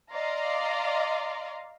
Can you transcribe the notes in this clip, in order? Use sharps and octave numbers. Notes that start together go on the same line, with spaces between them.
D5 D#5 F5 A#5 C6